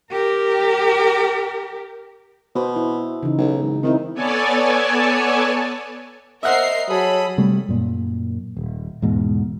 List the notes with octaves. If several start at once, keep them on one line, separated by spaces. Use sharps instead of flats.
G4 A#4
B2 C5
E4
C#3 E3 D#4
B1
G#1
D#3 C4 D#4 E4
B3 A4 C#5 D5 G#5 A5
A#4 C5 D#5 E5 F#5 C7
F#3 G#4 A4 B5 D#6
C3 G3 A3
F#2 A#2
D#1
E2 G#2 B2